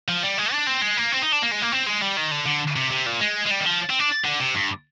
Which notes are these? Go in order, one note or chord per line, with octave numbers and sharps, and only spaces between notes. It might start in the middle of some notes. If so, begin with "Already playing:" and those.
F3
G3
G#3
D4
C4
G#3
A#3
C4
D#4
D4
A#3
G#3
A#3
C4
G#3
G3
D#3
D3
D3
C3
C3
A#2
G#3
G#3
G3
D#3
F3
C4
D4
D3
C3
G2